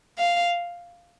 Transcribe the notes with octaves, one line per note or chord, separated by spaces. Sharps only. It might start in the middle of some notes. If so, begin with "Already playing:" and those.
F5